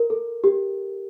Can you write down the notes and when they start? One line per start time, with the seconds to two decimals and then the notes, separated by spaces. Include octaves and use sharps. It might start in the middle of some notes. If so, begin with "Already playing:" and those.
Already playing: A#4
0.10 A4
0.44 G4